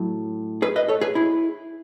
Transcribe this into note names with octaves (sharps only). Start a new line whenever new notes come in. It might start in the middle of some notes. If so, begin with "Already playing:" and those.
Already playing: A2 F#3
G#4 B4
B4 D#5
A4 C#5
G#4 B4
E4 G#4